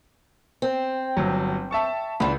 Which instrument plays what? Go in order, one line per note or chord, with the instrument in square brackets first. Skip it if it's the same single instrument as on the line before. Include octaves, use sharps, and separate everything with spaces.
[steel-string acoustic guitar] C4
[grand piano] G1 F#3
E5 A5 C#6
[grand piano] C#2 B5 [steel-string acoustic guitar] E3 D4